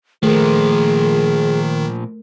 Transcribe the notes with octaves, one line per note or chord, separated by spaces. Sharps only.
A#2 D#3 F3 A3 G#4 A#4